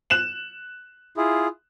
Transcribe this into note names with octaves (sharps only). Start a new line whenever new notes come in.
F#6 E7 F#7
E4 F4 G#4